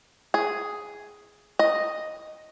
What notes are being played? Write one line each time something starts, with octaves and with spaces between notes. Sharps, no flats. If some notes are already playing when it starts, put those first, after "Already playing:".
G#4
D#5